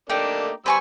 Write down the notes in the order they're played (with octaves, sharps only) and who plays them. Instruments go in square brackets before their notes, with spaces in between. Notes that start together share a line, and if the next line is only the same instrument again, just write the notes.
[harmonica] A3 A#3 D4 [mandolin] D#4 G4
[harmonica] G3 C5 E6 [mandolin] B4 G#5 C#6